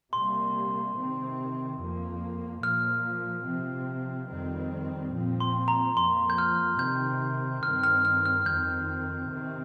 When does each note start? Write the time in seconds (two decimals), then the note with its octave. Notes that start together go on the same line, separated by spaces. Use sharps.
0.13 C3 G3 A#3 C6
0.96 C3 D#3 C4
1.79 F2 F3 A#3
2.63 A#2 F3 A#3 F6
3.46 C3 F3 C4
4.29 F2 D#3 G3 C4
5.13 A#2 F3 C4
5.40 C6
5.68 A#5
5.96 F2 F3 A#3 C6
6.30 G6
6.38 F6
6.79 C3 D#3 C4 G6
7.63 G2 D#3 C4 F6
7.84 F6
8.05 F6
8.26 F6
8.46 F2 D#3 C4 G6
9.30 C3 D#3 C4